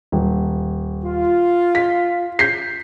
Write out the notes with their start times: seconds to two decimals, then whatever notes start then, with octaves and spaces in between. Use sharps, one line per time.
0.12 D#1
1.04 F4
1.75 B6
2.39 G6 B6 C7